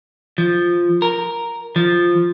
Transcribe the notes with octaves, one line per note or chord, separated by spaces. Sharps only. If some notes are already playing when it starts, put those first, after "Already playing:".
F3
A#4
F3